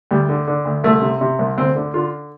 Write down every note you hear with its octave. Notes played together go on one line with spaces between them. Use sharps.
D2 G3
D3
D3
D2
C2 A3
C3
C3
C2
D2 C4
D3
D3 F4